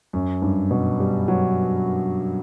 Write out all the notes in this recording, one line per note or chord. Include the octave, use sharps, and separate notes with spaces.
F#2
G2
B2
G3
F#3